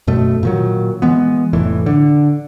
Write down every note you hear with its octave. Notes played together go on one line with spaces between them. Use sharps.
F#2 B2 A3
A#2 D#3 F#3
E3 G#3 B3
F1 A2 E3
D3